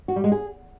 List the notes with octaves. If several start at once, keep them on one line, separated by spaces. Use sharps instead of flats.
F#4
G3
G#3
G#4